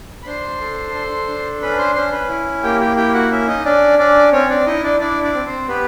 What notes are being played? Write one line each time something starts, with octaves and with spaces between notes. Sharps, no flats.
B5
D4 C5 C6
A4
A4
D4
C#4 B4 B5
C5 C6
C#4 C5 C6
B4 B5
E4
A#3 G4 G5
G4 G5
E4 G4 G5
F#4 F#5
C#4 E4 E5
D#4 D#5
C#4 D4 D5
C#4 D4 D5
C4 C#4 C#5
D4 D5
D#4 E4 D#5
D4 D5
D4 E4 D5
D4 D5
C4
C4 C5
B3 G4 B4